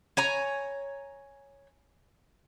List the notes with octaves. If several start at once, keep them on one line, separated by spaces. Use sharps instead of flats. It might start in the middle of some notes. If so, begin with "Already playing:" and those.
C#5 G#5 A#5